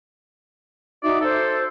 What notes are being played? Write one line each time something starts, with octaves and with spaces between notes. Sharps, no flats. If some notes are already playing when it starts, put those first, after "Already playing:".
D#4 F#4 D5 E5
A4 C5